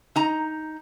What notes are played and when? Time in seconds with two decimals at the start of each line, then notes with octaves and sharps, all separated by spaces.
0.16 D#4 A#5